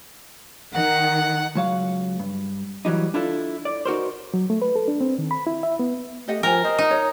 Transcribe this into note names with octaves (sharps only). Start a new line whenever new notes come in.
D#3 F#5
C#2 F#3 F5
G2
E3 F#3 G3 D#4
D4 E4 F4 A4
D5
D#4 F#4 A#4 C5
F#3
A3
B4
A4
D4
C4
D#3
B5
E4
E5
B3
A3 G4 D#5 F#5
F3 A#4 G5 G#5
C5 D#5
D#4
C#5